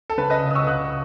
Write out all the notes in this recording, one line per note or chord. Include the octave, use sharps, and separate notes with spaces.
A4
C#3 B4
B4 D#5
C#2
D#6
C#6 E6
C#2 D#6 F#6